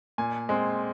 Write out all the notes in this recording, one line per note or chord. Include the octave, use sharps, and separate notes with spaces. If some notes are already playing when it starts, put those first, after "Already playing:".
A#2 G#5
G#3 C4